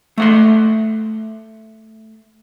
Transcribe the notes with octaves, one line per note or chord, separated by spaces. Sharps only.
A3 F#5 C6